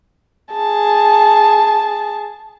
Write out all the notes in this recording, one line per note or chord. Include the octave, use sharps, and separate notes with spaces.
G#4 A5